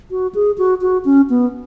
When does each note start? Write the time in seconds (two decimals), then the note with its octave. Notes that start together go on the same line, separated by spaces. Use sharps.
0.11 F#4
0.35 G#4
0.58 F#4
0.82 F#4
1.05 C#4
1.30 B3